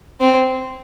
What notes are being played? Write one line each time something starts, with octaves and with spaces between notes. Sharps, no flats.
C4